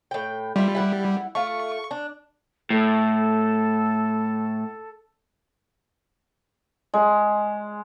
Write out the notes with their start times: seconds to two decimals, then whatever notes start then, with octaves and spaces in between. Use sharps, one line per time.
0.11 A2 G5
0.56 G3 E4 F4
0.75 E4 F#5
1.35 A3 F4 C#6
1.91 D4
2.70 A2 A4
6.94 G#3